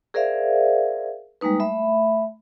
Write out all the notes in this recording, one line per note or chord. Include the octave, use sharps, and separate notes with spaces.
G#4 A#4 C5 D5 E5 F5
G3 G#3 A#3 D#4 B4
A3 E5 B5